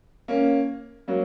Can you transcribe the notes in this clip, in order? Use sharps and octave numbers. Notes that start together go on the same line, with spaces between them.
A#3 C#4
F#3 A#3